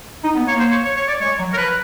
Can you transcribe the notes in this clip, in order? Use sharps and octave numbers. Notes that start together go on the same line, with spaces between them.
D#4
B3
A#3 C#5
C5
C#5
C#5
C#5
D5
G#3 C#5
F#3
A#4
F3 B4